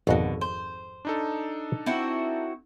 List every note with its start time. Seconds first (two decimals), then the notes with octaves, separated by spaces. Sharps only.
0.07 G#1 F2 B2 D3 F#4
0.41 C5
1.05 D4 D#4 A4
1.86 C4 E4 F#4